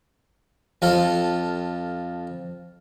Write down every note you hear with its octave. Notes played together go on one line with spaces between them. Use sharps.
F2 F4 A4